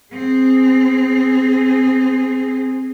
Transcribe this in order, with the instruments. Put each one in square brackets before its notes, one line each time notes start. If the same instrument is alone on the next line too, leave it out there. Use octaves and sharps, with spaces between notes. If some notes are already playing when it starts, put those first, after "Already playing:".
[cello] C4 G#4